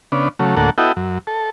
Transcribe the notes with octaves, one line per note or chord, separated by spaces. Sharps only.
C#3 B3 D4
C#3 F#3 A3
D2 A2 A#3 A4 F#5
B3 E4 F#4 A4 D#5 G5
F#2
A4